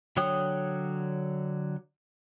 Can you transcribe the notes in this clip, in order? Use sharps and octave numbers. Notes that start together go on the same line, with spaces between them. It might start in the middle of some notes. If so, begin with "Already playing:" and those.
D3 F#3 C#5 G5 D#6